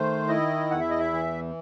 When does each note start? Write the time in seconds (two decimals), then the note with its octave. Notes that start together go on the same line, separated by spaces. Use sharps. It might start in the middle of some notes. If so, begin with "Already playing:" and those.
Already playing: D#3 A3 C5
0.28 E4 D#5
0.71 E2 F#5
0.80 E5
0.90 D#5
1.00 E5
1.13 E3